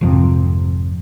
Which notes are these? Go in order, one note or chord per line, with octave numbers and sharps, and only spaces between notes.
G#1 F2 C3